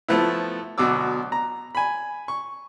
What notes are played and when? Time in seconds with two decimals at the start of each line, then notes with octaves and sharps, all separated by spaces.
0.08 F3 A3 B3 E4
0.78 D2 B2 F#3 D6 E6
1.32 A#5
1.75 G#5 B5
2.28 C#6